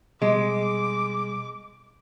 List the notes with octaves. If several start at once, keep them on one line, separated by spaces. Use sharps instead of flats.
B2 G3 G#3 D6